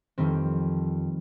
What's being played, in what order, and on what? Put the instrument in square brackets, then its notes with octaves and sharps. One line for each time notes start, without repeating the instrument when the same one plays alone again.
[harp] F2 D#3 G3 C4